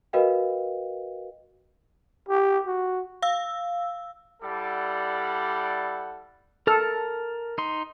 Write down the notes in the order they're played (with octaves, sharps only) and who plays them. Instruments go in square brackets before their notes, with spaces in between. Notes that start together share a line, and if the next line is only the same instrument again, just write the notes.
[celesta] F#4 A#4 B4 D#5 F5 G5
[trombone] G4
F#4
[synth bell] F5 E6
[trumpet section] G3 E4 A4 D5 F#5
[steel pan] A4 [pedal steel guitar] A#4 A5 F6
[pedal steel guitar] D#4 C6